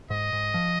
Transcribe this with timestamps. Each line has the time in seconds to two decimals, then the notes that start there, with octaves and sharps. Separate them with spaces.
0.10 G#2 D#5
0.33 G#2
0.54 F3